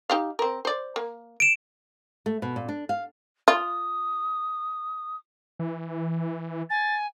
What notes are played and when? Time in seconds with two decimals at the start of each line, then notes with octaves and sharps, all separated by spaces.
0.10 D#4 G4 F5
0.39 C4 A#4
0.65 C5 D5
0.96 A#3
1.40 D7 E7
2.26 A3
2.42 B2
2.56 A#2
2.69 D4
2.89 F5
3.48 F4 D#6
5.59 E3
6.70 G#5 A6